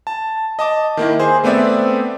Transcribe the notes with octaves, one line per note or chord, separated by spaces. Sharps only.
A5
D#5 A5 D6
D#3 A#3 E4
G#4 C5
A3 B3 C4 D5 E5